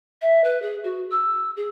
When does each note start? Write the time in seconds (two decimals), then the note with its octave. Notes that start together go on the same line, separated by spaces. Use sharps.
0.22 E5
0.44 B4
0.62 G#4
0.84 F#4
1.11 E6
1.57 G#4